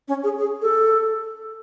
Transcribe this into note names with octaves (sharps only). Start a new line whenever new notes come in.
C#4
G#4
G#4
A4